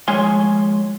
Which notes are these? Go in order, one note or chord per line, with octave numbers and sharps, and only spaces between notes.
D#2 F3 G#3 C#5 G#5 C6